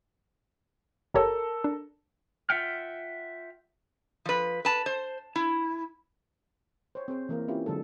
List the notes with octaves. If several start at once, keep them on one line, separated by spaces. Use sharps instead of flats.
G1 G4 A4 A#4 C#5
D4
F4 E5 F#5 G5 F6
F3 B4
B4 A5
C5
E4
C5 C#5
C4 G#4 C5
E3 A#3 A#4
C4 C#4 E4 F4 G4
D3 F#3 G#3 A4